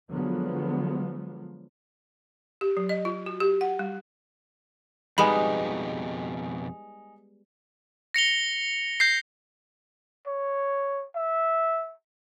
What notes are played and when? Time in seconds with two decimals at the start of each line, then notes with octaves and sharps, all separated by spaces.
0.10 D3 F3 F#3 G#3 B3
2.61 G4
2.77 F#3
2.89 D#5
3.05 F4
3.26 F#4
3.40 G4
3.61 F#5
3.79 G3
5.18 F2 B2 G3 G#3 B3 D#4 G#5 B5
8.14 A#6 C#7 F7 G7
9.00 G6 A#6 C7
10.26 C#5
11.15 E5